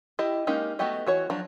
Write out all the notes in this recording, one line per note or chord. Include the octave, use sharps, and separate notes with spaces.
E4 G4 D#5
G#3 A#3 C#4 D#4 G4
A3 B3 F#4 G4 D#5
E3 F#4 C#5
F3 F#3 D4 A#5